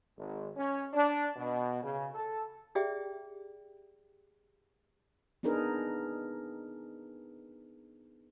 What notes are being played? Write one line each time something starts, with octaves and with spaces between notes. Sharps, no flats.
G#1
C#4
D4
B2
C#3
A4
G4 G#4 D5 E5 G5
B3 D4 D#4 G#4 A#4 B4